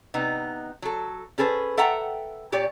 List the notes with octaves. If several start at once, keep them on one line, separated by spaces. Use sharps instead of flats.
C3 B3 D#4
F#3 A4
C#4 G#4 A4 B4 C5
A4 E5 F#5 G5 A#5
A#2 G4 C#5 D5